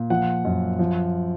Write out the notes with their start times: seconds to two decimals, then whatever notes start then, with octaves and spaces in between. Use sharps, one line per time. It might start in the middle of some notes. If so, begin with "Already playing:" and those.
Already playing: A#2
0.10 F3 F#5
0.45 F#2
0.79 F3